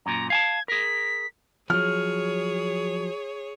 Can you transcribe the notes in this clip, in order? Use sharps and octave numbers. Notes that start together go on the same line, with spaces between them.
F#2 A#2 A#5
F5 G#5 A5 G#6
G#4 A#4 B6
F3 F#3 G#4 C#5 F6